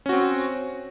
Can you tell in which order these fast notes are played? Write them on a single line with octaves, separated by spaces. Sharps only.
C#4 F#4 C4